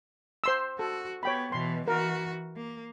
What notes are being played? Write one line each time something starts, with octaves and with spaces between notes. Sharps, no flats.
C5 C6 E6
F#4 A4
B3 C#5 G5 B5
B2 E3 C6
E3 F#4 A#4
A#3